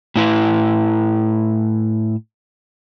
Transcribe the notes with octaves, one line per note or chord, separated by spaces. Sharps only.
A2 E4 B4